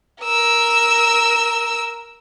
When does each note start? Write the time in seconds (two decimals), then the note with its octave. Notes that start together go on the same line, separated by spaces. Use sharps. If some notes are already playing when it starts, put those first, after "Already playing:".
0.22 A#4 E6